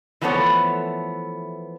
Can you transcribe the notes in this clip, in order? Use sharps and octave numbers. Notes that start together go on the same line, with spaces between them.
E3 F3 A3 B3 A4 C#5